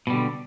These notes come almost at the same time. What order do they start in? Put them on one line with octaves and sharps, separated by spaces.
B2 G3 D3